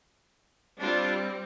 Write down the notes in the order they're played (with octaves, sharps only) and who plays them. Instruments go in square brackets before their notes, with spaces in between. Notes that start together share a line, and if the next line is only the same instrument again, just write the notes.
[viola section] G3 C4 D4 F4